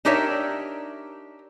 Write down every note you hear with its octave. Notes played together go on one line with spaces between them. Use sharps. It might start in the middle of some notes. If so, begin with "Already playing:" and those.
D4 D#4 G4 A#4 C#5 E5